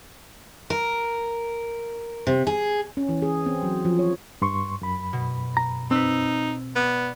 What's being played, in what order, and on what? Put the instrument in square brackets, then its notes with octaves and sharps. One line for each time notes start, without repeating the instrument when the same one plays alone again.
[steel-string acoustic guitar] A#4
C3
G#4
[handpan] C#4
E3
G#4
C4
F#3
F3
C#5
[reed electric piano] G2 C6 C#6
F#2 B5
[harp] B2
[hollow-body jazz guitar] A#5
[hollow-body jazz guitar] C4 [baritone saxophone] D#4 [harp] B4 E6
[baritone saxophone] B3 [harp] D5